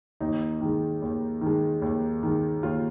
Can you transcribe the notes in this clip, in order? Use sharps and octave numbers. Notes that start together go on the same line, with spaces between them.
D#2 D#4
D#3 G#3
D#2
D#3 G#3
D#2
D#3 G#3
D#2 F4